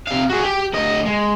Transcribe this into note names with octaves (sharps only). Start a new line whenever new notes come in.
C3 F5
F#4 G#4
G4
D2 D#5
G#3